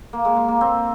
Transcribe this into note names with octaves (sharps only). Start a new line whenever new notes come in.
A#3
G#3
G#3
A#3
C4